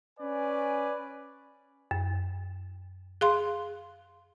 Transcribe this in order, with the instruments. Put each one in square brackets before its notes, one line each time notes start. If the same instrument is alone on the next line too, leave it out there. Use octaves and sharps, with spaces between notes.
[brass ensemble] C#4 B4 D5 G#5
[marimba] F#2
G#4 F5 C6